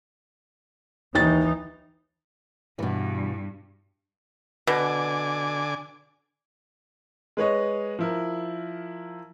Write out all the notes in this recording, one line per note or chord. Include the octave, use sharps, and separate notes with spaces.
D#2 E3 D#4 A6
G2 B2 E3
B2 D3 G#5 D6
G#3 B4 C#5 D#5
F3 E4 A#4